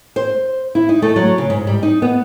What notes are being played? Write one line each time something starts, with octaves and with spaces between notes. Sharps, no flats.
C5
E4
D#4
A3
F#3
C#3
G#2
G3
D#4
B3